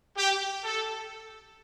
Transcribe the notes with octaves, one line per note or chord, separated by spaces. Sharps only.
G4
A4